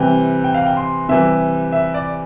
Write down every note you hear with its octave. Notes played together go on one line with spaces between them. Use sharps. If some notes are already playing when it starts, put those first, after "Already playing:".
Already playing: C3 E3 G3 G5
G5
F5
G5
C6
C3 E3 G3 E5
E5
D5